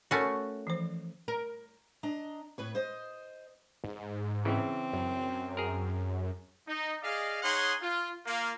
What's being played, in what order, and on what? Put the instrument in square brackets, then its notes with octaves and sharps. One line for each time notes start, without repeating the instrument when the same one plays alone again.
[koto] A3 C#4 F#4 [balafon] A#4 C#5 B5
[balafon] E3 F3 C5
[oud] A#4
[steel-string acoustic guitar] D4 D#5 A#5
A2 B4 C#5
C5 D#5
[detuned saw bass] G#2
[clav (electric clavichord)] C#3 E3 [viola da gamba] C4
[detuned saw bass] F#2
[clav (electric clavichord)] G#4 A#4
[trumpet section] D#4
G#4 D5 D#5 F5
D#4 G#4 C#5 F#5 G#5 C6
F4
A#3 F4 F5